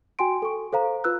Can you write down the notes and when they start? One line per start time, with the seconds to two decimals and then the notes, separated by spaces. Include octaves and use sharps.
0.19 F#4 G5 G#5 C6 D7
0.42 A4 C#6
0.73 A4 C5 F5 A#5
1.04 F4 B4 E6 F#6